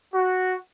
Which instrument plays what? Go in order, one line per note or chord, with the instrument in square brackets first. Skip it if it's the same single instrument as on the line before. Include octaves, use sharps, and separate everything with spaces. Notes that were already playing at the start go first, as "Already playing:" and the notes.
[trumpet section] F#4